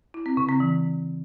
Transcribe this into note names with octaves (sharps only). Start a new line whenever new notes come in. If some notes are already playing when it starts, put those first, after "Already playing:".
E4
C4
C#3
C4
E3